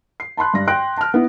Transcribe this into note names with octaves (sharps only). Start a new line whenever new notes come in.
C7
A5 B5 C6 F#6
G2 A#6
G5 C6 F#6 A#6 D7
A5 F6
B3 E4